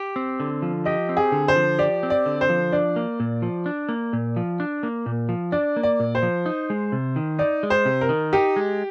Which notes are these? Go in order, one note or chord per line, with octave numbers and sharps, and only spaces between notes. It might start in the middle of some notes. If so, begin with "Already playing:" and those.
Already playing: G4
C4
D3
F3
G4 D#5
C4
G#4
D3
C5
F3
G4 D5
C4
D5
D3
C5
F3
D4 D5
A#3
A#2
F3
D4
A#3
A#2
F3
D4
A#3
A#2
F3
D4 D5
A#3
D5
A#2
C5
F3
D#4
G#3
C3
D#3
D#4 D5
G#3
C5
C3
A#4
D#3
D#4 G4
G#3